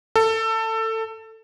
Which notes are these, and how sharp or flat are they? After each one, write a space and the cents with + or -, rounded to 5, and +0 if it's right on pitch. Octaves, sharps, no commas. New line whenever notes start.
A4 +20